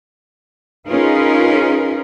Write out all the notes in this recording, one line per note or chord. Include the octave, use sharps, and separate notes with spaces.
C#4 D#4 F4 G#4 A#4 B4